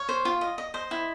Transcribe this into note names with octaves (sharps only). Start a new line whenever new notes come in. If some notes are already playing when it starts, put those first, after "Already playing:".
Already playing: C#5 F5
C5
F4
D#5
D#5
C5 D#5
E4